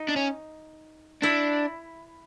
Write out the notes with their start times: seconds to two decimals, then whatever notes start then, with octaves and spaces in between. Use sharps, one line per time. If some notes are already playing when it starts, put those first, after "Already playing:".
Already playing: D#4
0.08 D4
0.16 C#4
1.22 D4 E4